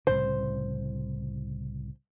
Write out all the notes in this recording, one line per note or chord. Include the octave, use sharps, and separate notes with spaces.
C2 A2 C#3 C5